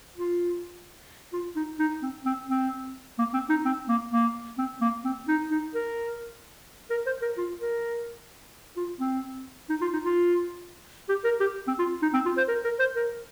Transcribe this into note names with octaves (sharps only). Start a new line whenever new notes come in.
F4
F4
D#4
D#4
C4
C4
C4
A#3
C4
D#4
C4
A#3
A#3
C4
A#3
C4
D#4
D#4
A#4
A#4
C5
A#4
F4
A#4
F4
C4
D#4
F4
D#4
F4
G4
A#4
G4
C4
F4
D#4
C4
F4
C5
A#4
A#4
C5
A#4